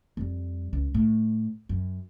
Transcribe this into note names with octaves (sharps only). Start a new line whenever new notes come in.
F2 G3
C#2
A2
F#2